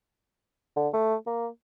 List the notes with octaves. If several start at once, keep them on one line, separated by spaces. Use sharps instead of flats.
D3
A3
A#3